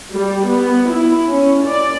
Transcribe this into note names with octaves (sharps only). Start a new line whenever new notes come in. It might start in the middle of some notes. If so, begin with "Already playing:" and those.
G3
B3
E4
C#4
D5